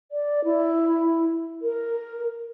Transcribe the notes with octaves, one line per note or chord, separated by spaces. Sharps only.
D5
E4
A#4